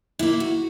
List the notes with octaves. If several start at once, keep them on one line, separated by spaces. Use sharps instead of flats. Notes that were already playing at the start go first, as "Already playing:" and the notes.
A#2 A#3 E4
F#4